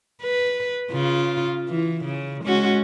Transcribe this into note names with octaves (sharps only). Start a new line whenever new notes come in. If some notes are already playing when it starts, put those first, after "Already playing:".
B4
C#3 F4
E3
C#3
G#3 C#4 F#4